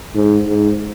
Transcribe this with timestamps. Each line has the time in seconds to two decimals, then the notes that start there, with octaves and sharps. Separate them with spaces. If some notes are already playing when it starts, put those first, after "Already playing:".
0.15 G#2
0.47 G#2